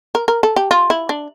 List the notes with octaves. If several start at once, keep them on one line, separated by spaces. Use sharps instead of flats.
A#4
A#4
A4
G4
F4
E4
D4